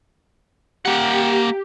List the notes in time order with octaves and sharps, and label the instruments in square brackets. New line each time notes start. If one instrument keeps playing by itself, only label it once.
[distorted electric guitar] A#3 F#5 [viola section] G4